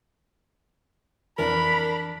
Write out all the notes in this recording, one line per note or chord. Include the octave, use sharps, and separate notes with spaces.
F2 E3 D4 A#4 B5